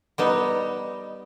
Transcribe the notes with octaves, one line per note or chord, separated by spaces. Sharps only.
G3 B3 D#4